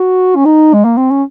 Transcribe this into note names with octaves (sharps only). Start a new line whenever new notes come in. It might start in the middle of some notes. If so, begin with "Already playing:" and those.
Already playing: F#4
C#4
D#4
G#3
A#3
C4
C#4